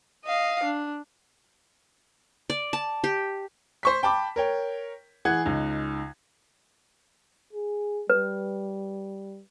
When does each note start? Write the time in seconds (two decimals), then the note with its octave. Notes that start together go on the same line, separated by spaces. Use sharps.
0.24 D#5 F5
0.64 D4
2.50 D5
2.73 A5
3.04 G4
3.83 C5 C#6 B6
4.03 G5 A5 B5 D6
4.36 A#4 C#5 G5
5.25 E3 G#4 F#5 F#6 G#6
5.45 C#2 D#4
7.53 G#4
8.10 G3 B4